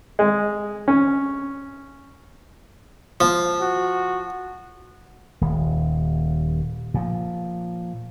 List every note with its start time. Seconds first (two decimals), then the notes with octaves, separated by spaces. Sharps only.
0.19 G#3
0.88 C#4
3.20 F3
3.61 F#4
5.41 D#1 D#2
6.94 A#2 F3